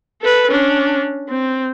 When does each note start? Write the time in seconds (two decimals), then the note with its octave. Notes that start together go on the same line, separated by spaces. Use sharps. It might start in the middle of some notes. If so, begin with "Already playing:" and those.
0.22 A4 B4
0.51 C#4 D4
1.29 C4